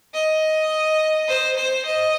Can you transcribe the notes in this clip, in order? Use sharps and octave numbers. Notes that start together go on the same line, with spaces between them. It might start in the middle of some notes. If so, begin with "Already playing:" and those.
D#5
C5
C5
D#5